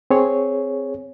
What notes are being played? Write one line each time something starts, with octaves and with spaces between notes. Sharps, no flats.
C4 G#4 C#5